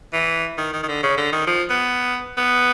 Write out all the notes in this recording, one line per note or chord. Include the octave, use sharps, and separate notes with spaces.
E3
D#3
D#3
D#3
D3
C#3
D3
D#3
F3
B3
B3